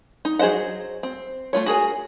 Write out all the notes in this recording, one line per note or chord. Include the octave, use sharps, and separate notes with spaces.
D#4
F#3 G#4 C5 D#5 F#5
C4
A3 F4 C#5
F#4 G#4 A#4 G#5